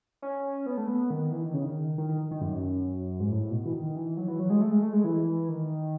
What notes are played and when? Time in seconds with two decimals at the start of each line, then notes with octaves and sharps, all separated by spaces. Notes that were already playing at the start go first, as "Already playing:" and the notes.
0.22 C#4
0.66 B3
0.77 A3
0.88 B3
1.10 D#3
1.32 E3
1.43 D#3
1.54 C#3
1.65 D#3
1.98 D#3
2.09 D#3
2.31 D#3
2.41 F#2
3.20 G#2
3.29 A2
3.51 B2
3.66 E3
3.73 D#3
3.95 E3
4.17 F#3
4.28 E3
4.39 F#3
4.50 G#3
4.61 A3
4.71 G#3
4.82 A3
4.93 G#3
5.04 E3
5.49 D#3